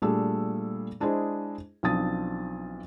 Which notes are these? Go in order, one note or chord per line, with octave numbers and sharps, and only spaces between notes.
A#2 G3 A3 D4 G#4 E6
G#3 D4 E4 G#4 C5 D#5
B1 F3 C4 D4 D#6 A6